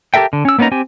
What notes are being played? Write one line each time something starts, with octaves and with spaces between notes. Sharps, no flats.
G4 A4 A#4 E5 G5
D3
C#4 E6
A#3 B3 C#4 D#4 A#5
C4 G4 G#5